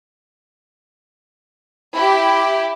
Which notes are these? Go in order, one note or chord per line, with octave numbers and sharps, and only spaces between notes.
E4 G4